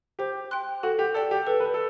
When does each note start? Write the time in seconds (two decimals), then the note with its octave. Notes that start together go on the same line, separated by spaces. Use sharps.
0.19 G4 C5
0.51 G5 C6 F#6
0.83 F#4 A4
0.99 G4
1.14 A4 D5 G5
1.31 G4
1.47 A4 B4
1.60 B4
1.74 A4